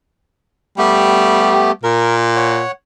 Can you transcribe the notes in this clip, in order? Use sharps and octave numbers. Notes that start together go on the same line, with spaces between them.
G3 A3 B3 G4
A#2 A#4
C#5 F#5